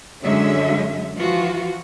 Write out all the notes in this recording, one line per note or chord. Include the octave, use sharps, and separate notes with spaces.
F#2 D3 F#3 G#3 C#4 E5
E3 F3 F4 F#4